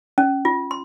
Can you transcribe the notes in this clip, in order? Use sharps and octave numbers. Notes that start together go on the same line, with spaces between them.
C#4
F4
C6